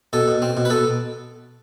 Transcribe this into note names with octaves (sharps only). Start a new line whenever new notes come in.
B2 A4
B2
C4
B2
B4
B2 A4